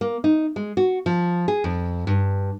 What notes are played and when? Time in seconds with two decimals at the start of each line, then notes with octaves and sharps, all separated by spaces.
0.01 A#3
0.24 D#4
0.56 G#3
0.77 F#4
1.06 F3
1.48 G#4
1.64 F2
2.07 G2